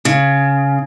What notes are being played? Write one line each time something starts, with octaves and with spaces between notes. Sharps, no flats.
C#3